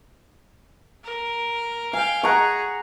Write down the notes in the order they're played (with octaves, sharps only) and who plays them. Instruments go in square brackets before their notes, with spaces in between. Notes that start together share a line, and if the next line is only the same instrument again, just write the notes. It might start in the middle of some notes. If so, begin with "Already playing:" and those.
[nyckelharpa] A#4
[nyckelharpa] F5 G5 [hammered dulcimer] G#5
[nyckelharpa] G#4 [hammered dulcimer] F#5 A#5 C#6